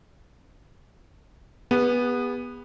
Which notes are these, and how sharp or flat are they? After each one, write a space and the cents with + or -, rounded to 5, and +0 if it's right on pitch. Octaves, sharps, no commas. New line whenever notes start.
B3 -10 G#4 -45